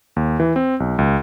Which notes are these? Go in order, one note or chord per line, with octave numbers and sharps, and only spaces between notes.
D#2
E3
C4
B1
C#2